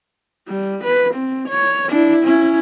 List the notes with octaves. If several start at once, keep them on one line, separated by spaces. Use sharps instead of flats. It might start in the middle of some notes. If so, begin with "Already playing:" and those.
G3
B4
C4
C#5
D4 E4
C#4 E4